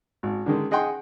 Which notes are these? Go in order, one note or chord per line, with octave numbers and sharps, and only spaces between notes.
G#1
D3 D#3 G#3
G#4 D#5 F#5 G5 C6